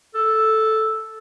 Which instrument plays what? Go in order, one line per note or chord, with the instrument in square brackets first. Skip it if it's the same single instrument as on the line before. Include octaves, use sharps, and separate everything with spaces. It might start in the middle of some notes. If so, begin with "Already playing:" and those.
[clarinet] A4